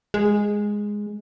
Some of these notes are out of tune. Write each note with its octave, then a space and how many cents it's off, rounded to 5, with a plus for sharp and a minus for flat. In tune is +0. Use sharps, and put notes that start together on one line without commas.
G#3 -5